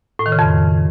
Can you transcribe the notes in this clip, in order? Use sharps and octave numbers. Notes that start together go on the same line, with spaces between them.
A2
D#3
C#3
F2